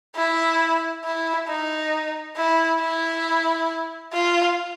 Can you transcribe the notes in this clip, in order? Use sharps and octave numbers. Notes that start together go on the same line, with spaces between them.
E4
E4
D#4
E4
E4
F4